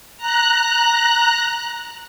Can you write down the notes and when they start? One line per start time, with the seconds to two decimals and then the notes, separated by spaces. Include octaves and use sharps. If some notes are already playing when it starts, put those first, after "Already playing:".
0.17 A#5 F#6